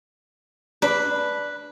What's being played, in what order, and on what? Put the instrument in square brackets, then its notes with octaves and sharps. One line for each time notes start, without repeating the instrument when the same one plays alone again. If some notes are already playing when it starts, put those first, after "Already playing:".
[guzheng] D4 [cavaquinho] B4 B5